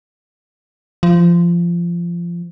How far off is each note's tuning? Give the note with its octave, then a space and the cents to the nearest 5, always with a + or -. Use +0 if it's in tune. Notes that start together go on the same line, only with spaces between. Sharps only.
F3 -20